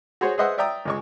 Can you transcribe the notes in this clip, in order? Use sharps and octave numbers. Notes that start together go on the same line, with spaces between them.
F#4 G#4 C5 C#5
G#4 B4 C5 D#5 E5 F#5
D5 E5 G5 A#5 D#6
C#2 G#3 C#6